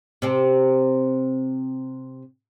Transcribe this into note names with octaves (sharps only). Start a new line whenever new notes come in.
C3 C4